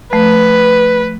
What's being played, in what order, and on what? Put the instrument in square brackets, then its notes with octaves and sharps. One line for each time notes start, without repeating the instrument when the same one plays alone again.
[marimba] F3 A3 [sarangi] B4